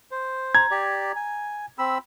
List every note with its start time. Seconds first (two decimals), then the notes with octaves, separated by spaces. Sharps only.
0.11 C5
0.55 A#5 G#6
0.71 G4 D5
1.16 G#5
1.78 C4 B5 E6